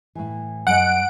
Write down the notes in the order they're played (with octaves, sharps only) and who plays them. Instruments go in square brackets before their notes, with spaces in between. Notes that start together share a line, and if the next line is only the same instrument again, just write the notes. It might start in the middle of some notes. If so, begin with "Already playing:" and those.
[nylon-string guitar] A2 E3
[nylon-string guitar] F#2 D#5 [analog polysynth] F#5 D7